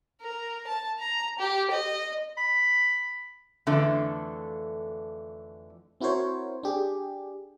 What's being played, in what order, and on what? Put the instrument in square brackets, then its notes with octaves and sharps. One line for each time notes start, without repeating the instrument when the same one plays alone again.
[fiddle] A#4
A5
A#5
G4
D#5
[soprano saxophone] B5
[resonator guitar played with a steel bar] F2 D3 E3 A3 D4
[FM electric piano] C4 E4 F#4 A#4 C5 C#5
D4 G4 G#4